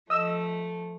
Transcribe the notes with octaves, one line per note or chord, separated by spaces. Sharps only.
F3 A3 D#5 E6